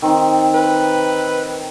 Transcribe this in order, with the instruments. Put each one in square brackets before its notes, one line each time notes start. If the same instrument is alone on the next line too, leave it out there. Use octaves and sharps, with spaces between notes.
[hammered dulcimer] D#3 C4
[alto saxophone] B4